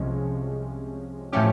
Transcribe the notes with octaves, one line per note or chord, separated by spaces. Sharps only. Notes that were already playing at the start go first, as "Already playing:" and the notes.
Already playing: C2 C3 F3 G#3 C#4
A2 F3 A3 C#4 G4